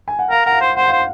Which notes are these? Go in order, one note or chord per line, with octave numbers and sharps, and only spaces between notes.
G#5
F#5
A#4 F5
A#4 F#5
F5
C5
C5 F#5
C5 F5